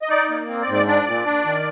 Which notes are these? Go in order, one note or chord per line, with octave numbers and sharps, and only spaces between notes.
D#5
D#4 D5
A#3
C4
D5
G#2
D5
D4 D5
A#2
D4
D#3